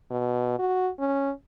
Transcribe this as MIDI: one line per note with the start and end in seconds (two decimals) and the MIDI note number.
0.11 0.56 47
0.59 0.90 66
0.99 1.31 61